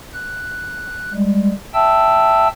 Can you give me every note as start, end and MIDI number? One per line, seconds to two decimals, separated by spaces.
0.14 1.13 90
1.13 1.52 55
1.13 1.52 56
1.74 2.48 76
1.74 2.48 79
1.74 2.48 81
1.74 2.48 88